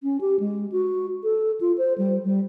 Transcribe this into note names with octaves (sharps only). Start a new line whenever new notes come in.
C#4
G4
G#3
F#4
A4
F4
C5
G3
G3